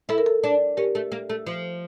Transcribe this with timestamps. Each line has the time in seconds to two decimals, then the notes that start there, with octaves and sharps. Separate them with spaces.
0.09 E4 A4
0.18 A#4
0.26 A4
0.44 D4
0.77 C#4 G4 A#4
0.95 A3
1.12 A#3
1.30 A3
1.47 F3